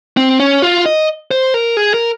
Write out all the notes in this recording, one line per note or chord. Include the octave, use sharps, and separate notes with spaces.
C4
C#4
F4
D#5
C5
A#4
G#4
A#4